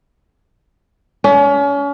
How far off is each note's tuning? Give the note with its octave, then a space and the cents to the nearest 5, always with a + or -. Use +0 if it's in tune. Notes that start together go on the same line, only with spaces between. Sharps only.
C#4 +35